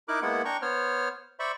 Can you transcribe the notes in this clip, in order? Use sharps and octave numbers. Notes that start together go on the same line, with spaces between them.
D#4 E4 A#4 D6 F#6
G#3 A#3 B3 E4 F#5
D4 G5 A#5 C#6
B3 C5 C#5 F6
C5 D5 E5 B5 C#6